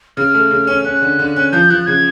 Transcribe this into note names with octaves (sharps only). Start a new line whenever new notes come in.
C#3 F6
A3
C#3
C#4
C#4 F#6
D3
D3
C#4
F3 G6
F3 F#6
C#3 G#6